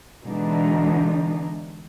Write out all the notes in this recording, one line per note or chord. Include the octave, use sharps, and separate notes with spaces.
B2 D3 E3 G#3 D4 D#4